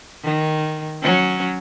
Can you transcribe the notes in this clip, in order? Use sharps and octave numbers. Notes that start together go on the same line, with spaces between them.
D#3
F#3 C#4